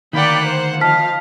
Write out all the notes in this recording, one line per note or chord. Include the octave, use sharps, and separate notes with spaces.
D2 D#3 A#3 D5 F#5 G5 B5
C5
F3 D#5 F5 A5 F6 B6